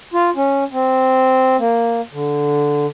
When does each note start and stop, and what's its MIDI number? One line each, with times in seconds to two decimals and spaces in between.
0.14 0.30 65
0.36 0.64 61
0.72 1.56 60
1.59 2.01 58
2.13 2.86 50